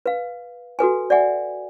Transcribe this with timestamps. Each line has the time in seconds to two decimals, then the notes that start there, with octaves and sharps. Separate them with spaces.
0.06 B4 F5
0.79 F#4 A4 B4 G#5
1.10 D5 E5 F#5 G#5